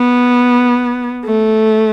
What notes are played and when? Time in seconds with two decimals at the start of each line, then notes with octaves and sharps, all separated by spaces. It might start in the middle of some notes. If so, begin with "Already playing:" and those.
Already playing: B3
1.25 A3